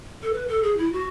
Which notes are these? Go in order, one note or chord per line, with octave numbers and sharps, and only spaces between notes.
A4
B4
A4
G#4
E4
F#4